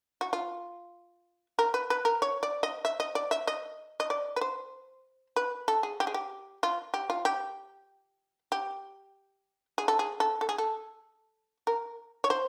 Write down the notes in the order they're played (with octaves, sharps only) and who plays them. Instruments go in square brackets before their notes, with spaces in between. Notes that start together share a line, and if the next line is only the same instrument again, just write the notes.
[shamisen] F#4
F4
A#4
B4
B4
A#4
C#5
D5
D#5
E5
D#5
D5
E5
D#5
D#5
D5
B4
C5
B4
A4
G#4
G4
G#4
G4
F4
G4
F4
G4
G4
G#4
A4
G#4
A4
A4
G#4
A4
A#4
C#5
C5